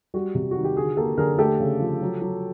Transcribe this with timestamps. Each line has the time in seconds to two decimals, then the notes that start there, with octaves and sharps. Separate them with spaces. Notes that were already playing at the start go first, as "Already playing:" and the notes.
0.14 G3 F#4
0.35 C3
0.51 D#3 F#4
0.64 G4
0.76 D3 F#4 G#4
0.97 A#3 G4 A4
1.17 D3 G#4 A#4
1.38 A3 G4 A4
1.60 C#3
1.80 F3
2.01 F#3
2.21 F#3